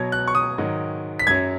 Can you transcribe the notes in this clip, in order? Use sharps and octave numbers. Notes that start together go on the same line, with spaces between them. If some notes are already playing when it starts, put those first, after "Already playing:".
Already playing: B2 F#3 G#6
F#6
C#6
D#6
G#2 D#3 F#3
B6
F#2 F#3 G#6